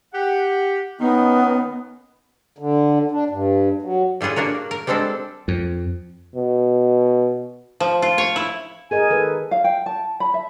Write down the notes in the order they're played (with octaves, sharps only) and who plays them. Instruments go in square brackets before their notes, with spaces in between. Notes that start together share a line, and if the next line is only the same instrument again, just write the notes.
[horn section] G4 F#5
[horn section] D#3 C#4 D#4 [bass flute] B3
[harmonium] D3
D4
G2
F#3
[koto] A2 G3 F4 G#4 F#5
A#3 D4 F#4 A#4
A#4
G3 G#3 C4 D4 A4
[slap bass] F2
[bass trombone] B2
[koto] F3
F4
C#5
E4
[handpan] G#4 A#4 D#5 [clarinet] G#5
[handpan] D#3 A4 B4
[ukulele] F5
G5
A5
B5
E5